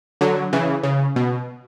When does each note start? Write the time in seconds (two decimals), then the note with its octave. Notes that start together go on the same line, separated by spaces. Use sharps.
0.21 D3 F#3
0.53 C#3 E3
0.83 C#3
1.16 B2